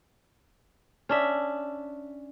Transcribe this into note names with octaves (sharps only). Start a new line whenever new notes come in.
C#4 D4 E5